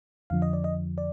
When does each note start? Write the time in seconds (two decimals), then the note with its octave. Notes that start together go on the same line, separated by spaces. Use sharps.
0.30 F2 D3 F3 F5
0.42 D#5
0.53 D5
0.64 D#5
0.98 D5